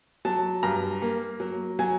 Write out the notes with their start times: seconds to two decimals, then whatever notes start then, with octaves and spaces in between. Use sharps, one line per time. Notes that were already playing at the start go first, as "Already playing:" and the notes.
0.25 F#3 A5
0.63 G2 A#5
1.02 A#3
1.40 F#3
1.79 F#3 G#5